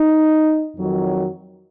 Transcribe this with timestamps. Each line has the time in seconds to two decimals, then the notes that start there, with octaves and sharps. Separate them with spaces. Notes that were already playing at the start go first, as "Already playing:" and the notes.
Already playing: D#4
0.76 F2 D#3 F#3